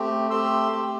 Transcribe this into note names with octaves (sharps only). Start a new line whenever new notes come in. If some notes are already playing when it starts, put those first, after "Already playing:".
Already playing: A3 C4 G4
A3 C4 G4 C6 E6
A3 C4 G4